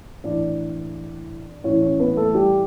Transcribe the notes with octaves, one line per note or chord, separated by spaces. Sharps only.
A2 E3 D4 D5
A2 E3 C#4 C#5
C#4 C#5
B3 B4
A3 A4
G3 G4